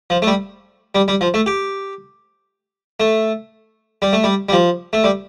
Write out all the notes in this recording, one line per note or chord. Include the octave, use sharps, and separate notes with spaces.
F3
A3
G3
G3
G3
F3
A3
G4
A3
G3
A3
G3
G3
F3
A3
G3